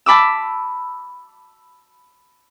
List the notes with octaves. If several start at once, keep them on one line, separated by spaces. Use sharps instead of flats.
A5 B5 D6 E6